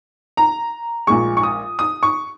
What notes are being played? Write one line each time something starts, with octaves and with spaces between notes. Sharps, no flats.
A#5
A#1 A#2 G#3 C#6
C#6
D#6
D#6
C#6